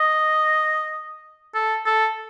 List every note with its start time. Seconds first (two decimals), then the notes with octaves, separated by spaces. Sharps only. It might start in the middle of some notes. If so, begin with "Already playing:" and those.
Already playing: D#5
1.55 A4
1.86 A4